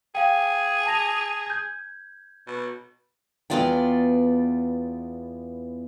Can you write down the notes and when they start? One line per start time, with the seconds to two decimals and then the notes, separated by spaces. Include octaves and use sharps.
0.15 G#4 F5 G5
0.86 A5 A#6 F7
1.46 G6 G#6
2.47 B2
3.50 E2 G#3 B3 F4 D5 G5